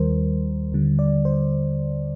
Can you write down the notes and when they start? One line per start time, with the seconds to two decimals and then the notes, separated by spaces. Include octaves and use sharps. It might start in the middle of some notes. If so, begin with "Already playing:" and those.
Already playing: D#2 D#3 G3 A#4 C5
0.72 D#2 D3 G3
0.99 D5
1.25 C5